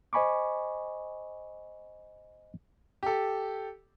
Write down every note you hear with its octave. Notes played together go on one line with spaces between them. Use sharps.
C5 D#5 G#5 B5 C#6 D6
G4 A4